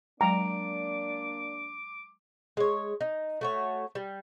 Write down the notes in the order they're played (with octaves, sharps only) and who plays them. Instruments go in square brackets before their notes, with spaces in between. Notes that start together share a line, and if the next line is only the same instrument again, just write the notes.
[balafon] F#3 G#3 G5 [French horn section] A#3 D4 D5 [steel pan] A#5 [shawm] D6
[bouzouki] G#3 C#5
D#4
A3 F#4 C#5
G3